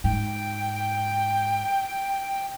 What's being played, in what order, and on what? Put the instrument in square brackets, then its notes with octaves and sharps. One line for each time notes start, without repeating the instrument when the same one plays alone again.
[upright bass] G#2 [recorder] G5